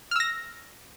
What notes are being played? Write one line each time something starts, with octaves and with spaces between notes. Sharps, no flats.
E6 F6 A#6